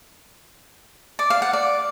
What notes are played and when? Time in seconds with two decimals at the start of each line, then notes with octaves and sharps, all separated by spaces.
1.19 D5
1.30 F5
1.42 F#5
1.53 D5